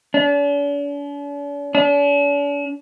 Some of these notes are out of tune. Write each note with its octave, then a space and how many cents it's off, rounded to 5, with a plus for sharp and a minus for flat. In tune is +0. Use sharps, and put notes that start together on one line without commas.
D4 -45
D4 -45